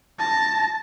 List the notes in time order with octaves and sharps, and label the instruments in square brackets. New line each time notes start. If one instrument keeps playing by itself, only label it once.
[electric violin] A5 A#6